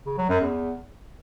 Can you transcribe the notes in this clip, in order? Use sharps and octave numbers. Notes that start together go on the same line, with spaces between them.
C#3
F#3
F#2
E2